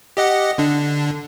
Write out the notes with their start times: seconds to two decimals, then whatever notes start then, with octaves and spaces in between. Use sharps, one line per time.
0.17 G4 D#5 F#5
0.58 D3 D4